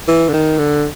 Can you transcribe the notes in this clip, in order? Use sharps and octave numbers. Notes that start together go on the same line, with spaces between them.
E3
D3
D#3
D3